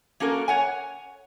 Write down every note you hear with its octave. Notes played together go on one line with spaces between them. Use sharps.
A#3 C#4 F#4 A4 A#4
C#5 F#5 G#5